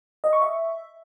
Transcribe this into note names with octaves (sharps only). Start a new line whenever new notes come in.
D#5
C#6
E5